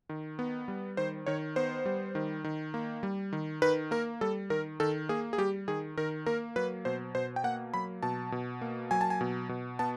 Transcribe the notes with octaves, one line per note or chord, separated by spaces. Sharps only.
D#3
B3
G3
D#3 C5
D#3 C#5
B3 C5
G3
D#3
D#3
A#3
G3
D#3
D#3 B4
A#3 A#4
G3 A4
D#3 A#4
D#3 A4
A#3 G#4
G#4
G3 G4
D#3 G#4
D#3 A#4
A#3 A#4
F#3 B4
B2 C5
B2 C5
G5
A#3 F#5
F#3 B5
B2 A5
B2
A#3
F#3 G#5
A5
G#5
B2
B2
B3 A5